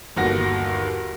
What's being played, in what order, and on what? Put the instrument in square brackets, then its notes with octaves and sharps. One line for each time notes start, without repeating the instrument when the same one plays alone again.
[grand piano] G1 D#2 F#4 A#6